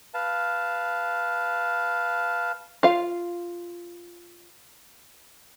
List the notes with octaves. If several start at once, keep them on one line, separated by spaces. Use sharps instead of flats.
B4 F5 A5
F4 F5